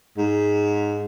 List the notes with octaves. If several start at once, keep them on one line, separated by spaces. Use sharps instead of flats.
G#2